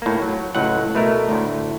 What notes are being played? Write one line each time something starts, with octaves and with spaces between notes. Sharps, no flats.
A2 A#3
F#3
C#2 A2 F#3 F#5
B2 A3 A#4
D2 A2